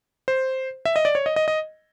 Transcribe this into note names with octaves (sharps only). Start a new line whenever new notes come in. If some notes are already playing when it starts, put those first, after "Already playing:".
C5
E5
D#5
D5
C#5
D#5
D#5
D#5